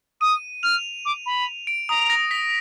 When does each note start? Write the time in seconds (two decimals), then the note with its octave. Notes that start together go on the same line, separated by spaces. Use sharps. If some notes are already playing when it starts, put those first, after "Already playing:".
0.21 D#6 D#7
0.63 F6 F7
1.05 D6
1.26 B5
1.67 D7
1.89 A#5 D#6
2.10 A#6
2.31 B6